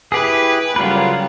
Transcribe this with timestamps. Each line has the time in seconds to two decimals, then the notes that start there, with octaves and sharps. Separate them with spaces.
0.12 E4 G4 G#4 B4
0.76 C#3 F#3 G3 F4 A#4 B4